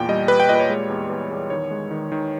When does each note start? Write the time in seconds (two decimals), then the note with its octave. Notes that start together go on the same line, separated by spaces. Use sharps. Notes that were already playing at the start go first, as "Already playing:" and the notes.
Already playing: E2 A#2 G5
0.09 G3 D#5
0.28 G3 B4
0.40 G5
0.49 A#2 D#5
0.55 B4
0.60 C#5
0.70 G#3
0.89 E2
1.10 E2
1.31 E2
1.50 D#3 C#5
1.71 G#3
1.91 D#3
2.12 D#3